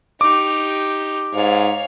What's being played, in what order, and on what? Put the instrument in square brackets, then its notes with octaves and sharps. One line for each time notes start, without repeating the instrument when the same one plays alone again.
[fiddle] D#4 G4 [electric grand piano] D6
[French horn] G#2 [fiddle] C#5 F5